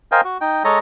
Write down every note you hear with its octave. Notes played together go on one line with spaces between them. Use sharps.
A#4 C5 D#5 F5 G5 G#5
F#4
D#4 G5
G#3 A4 C#5 D#5 A#5